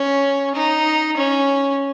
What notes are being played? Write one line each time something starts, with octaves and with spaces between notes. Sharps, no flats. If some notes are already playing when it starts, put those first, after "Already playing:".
Already playing: C#4
D#4
C#4